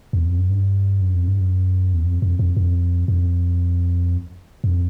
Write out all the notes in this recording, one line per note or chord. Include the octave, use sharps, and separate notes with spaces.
E2
F2
F#2
G2
F#2
F2
G2
F#2
E2
F2
F2
F2
F2
F2
F2